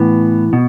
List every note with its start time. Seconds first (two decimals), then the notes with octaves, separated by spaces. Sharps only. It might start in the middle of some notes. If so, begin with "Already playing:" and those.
Already playing: A2 E3 B3
0.53 B2